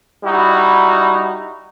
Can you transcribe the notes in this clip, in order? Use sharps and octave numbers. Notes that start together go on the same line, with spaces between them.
G3 D#4 E4 F#4